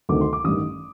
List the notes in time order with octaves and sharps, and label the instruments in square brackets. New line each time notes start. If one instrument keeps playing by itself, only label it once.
[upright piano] D2 C3 D#3 D6
C6
D6
A1 G2 D#3 D#6